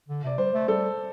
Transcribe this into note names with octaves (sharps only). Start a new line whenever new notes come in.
D3
C3 D5
G3 C5
A3
G3 A4